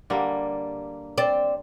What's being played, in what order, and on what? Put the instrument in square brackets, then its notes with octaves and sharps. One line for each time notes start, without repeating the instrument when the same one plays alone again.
[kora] D3 G3 A#3
[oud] C4 D5